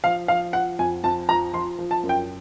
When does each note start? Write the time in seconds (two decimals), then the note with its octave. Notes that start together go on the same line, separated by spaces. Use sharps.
0.04 F3 F5
0.28 F3 F5
0.53 F3 F#5
0.79 F2 G#5
1.04 F2 A5
1.29 F3 A#5
1.53 F3 C6
1.78 F3
1.91 A5
2.03 F#2
2.09 G5